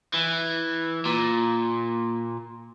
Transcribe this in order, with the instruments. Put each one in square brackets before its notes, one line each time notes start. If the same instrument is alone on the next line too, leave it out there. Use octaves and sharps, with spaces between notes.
[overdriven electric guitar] E3
A#2